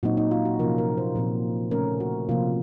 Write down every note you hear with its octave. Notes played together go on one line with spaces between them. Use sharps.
A#2 F#3 C4 D#4 F#4
D#4
F4
F#4
C3 F3 A#3 C#4 A#4
A#4
C5
A#2 F3 C4
C#3 A3 C#4 A#4
F#4
C3 F3 A#3 F4